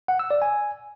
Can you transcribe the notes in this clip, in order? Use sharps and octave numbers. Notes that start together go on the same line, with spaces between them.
F#5
E6
D5
G#5